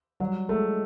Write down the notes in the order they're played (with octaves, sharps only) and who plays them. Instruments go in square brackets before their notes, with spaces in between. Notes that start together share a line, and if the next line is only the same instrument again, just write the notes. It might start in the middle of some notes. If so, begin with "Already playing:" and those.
[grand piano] F#3 [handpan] G3
[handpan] G#3 [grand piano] A3